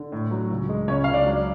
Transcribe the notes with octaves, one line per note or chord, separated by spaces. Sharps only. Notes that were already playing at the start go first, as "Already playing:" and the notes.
Already playing: D3
A2
F#3
C#2
G#3
C#2 C#4 C#5
C#2 F5
D4 D5
F#3